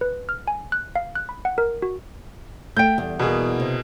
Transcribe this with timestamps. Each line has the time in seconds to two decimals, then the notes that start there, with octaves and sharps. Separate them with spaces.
0.01 B4
0.29 F6
0.48 G#5
0.72 F#6
0.96 F5
1.15 F#6
1.29 B5
1.45 F#5
1.58 A#4
1.82 F#4
2.77 A3 G5 G6 D7
2.98 E2 G3
3.19 B2 A#3 G#4
3.60 C3